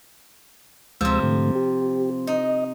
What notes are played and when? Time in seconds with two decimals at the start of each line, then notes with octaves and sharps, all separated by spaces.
1.01 D2 C3 F3 G#3 E6
1.22 G#2 D3 A3
1.55 G4
2.27 D#4 D#5